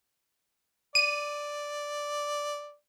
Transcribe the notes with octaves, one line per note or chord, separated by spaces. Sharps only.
D5 D#7